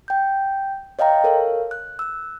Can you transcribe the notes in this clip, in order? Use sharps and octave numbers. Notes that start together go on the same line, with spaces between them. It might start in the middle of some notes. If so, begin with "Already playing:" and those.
G5 G6
C#5 D#5 F5 G5 A#5
A4 A#4 C#5 F5
F#6
E6 F#6